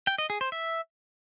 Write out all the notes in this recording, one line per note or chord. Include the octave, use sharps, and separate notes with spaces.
G5
D#5
G#4
C5
E5